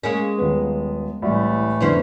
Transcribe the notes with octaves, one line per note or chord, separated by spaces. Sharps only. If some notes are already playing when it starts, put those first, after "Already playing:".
G#3 A#3 C#4
D#1 B3
C2 A2 E3 A3
F1 D3 B3 C#4 E4 C5